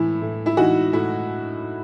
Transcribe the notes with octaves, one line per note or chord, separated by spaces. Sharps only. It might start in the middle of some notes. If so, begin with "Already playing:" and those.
Already playing: A2 E3 E4
A2
E4
E3 D#4 F#4
A2 E4